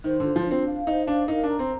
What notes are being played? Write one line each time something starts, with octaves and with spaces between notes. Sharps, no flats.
D#3 C5
D3 F4
F3
D4
C4
F5
D#4 C5
D4 F5
D#4 A#4
D4 A#5
C4